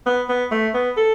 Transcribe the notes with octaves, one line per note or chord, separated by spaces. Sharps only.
B3
B3
A3
B3
A4